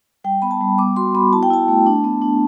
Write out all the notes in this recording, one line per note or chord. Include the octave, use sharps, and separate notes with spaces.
G3 G5
B3 B5
A5
G3
B3 D6
F#4 C6
B3 B5
E4 A5
G5
E4 A5
A3
D4
B3
D4